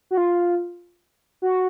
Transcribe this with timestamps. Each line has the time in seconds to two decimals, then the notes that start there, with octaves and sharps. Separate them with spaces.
0.11 F#4
0.17 F4
1.42 F#4